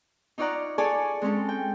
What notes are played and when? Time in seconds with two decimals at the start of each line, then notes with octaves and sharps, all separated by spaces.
0.38 D#4 F4 C#5 D5 F#5 A#5
0.78 G#4 A4 C#5 D5 G#5 A5
1.22 G#3 C4 C#4 A4
1.49 G5